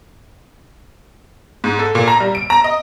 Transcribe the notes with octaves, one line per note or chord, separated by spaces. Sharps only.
G#2
A4
A#2
A#5
G3
D7
A#5
D#5